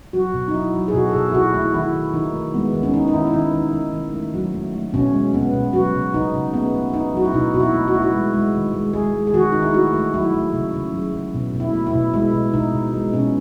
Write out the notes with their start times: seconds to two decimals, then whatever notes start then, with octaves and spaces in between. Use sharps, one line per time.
0.13 F#3 F#4
0.34 B2
0.48 D#4
0.54 F#3 E4
0.74 F#3
0.88 G#4
0.93 B2 F#4
1.09 A4
1.13 B2 G#4
1.30 E4
1.34 B2 F#4
1.54 A3 E4
1.74 D#3 E4
1.94 D#3
2.14 D#3 D#4
2.33 A3
2.54 G#3 B3
2.73 D#3
2.83 C#4
2.94 D#3 D#4
3.07 D#4
3.13 D#3 E4
3.27 E4
3.34 D#3 D#4
3.54 D#3
3.73 D#3
3.94 D#3
4.14 A3
4.34 F#3
4.54 A3
4.74 A3
4.94 B2 C#4
5.14 G#3
5.34 B2 B3
5.53 B2
5.73 F#3 F#4
5.93 C#3
6.14 C#3 D#4
6.34 C#3
6.53 A3 B3
6.74 C#3
6.94 C#3 D#4
7.14 F#3 F#4
7.25 E4
7.34 B2 D#4
7.54 B2 F#4
7.60 E4
7.73 A3
7.88 F#4
7.93 A3 E4
8.02 F#4
8.14 G#3
8.34 G#3
8.54 D#3
8.73 G#3
8.93 G#3 G#4
9.13 G#3
9.27 G#4
9.34 D#3 F#4
9.52 D#3 D#4
9.62 E4
9.74 A3 F#4
9.93 A3
10.14 F#3 E4
10.34 A3
10.53 C#3
10.73 C#3
10.93 F#3
11.13 C#3
11.34 B2
11.54 B2
11.60 E4
11.73 A3
11.87 E4
11.94 B2
12.13 G#3 E4
12.33 B2
12.54 B2 D#4
12.74 B2
12.94 G#3
13.13 B2 C#4